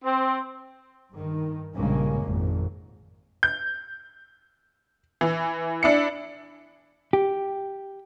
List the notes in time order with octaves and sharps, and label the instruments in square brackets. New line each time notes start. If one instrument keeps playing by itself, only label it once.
[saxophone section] C4
[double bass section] G2 D#3
A#1 G2 C#3 G#3 A#3 C#4
G#1 F2 A#2
[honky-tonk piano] G6
E3
D4 E4 C#7
[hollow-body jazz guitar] G4